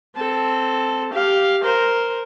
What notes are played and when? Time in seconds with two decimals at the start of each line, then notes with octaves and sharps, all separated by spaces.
0.16 C4 A4
1.14 G4 F5
1.63 A#4 C5